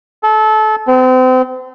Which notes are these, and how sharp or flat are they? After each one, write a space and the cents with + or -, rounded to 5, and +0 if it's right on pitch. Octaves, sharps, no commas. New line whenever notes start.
A4 -25
C4 -35